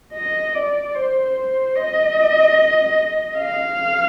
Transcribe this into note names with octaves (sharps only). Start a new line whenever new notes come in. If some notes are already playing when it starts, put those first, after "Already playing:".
D#5
D5
C5
C5
D#5
F5